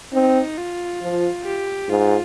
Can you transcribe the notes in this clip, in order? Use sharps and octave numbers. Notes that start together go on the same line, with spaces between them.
C4 D#4
F4
F3
G4
G#2 F4